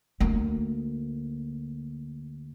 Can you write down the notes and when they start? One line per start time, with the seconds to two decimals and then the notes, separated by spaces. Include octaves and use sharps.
0.20 D2 A#3